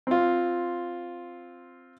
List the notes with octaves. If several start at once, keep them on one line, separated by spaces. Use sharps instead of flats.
C4 F4